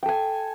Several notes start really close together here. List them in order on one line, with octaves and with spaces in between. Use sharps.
G5 A4 G#5